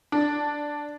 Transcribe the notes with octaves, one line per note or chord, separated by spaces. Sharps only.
D4